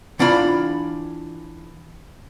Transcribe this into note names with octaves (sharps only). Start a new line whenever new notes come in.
E3 D4 F4 B5